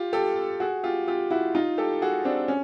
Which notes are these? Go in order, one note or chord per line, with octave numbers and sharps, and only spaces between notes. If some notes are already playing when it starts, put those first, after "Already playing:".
Already playing: F4 G4
G4 A4
F#4 G#4
F4 G4
F4 G4
E4 F#4
D#4 F4
G4 A4
F#4 G#4
C4 D4
C#4